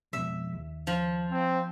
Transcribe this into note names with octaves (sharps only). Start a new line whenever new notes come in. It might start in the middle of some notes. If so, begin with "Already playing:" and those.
F2 B2 G#3 E5
D#2
F3
C4